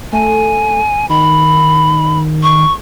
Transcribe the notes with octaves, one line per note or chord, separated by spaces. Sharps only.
A3 G#5
D#3 B5
C#6